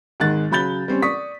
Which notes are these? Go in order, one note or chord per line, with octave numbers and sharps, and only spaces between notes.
G#1 D#3 G#3 F#6 A6
C#3 F#3 B5 G6 A6 G7
G3 C4 C#4
D5 C#6 D#6 B6